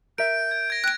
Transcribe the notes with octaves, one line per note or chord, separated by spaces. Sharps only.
A#4 E5 G6 D7
G#6
G#6 A#6
G5 F#6 D7